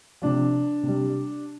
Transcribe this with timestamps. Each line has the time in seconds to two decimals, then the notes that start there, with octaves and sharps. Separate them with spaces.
0.22 C3 F3 D4
0.83 C3 G3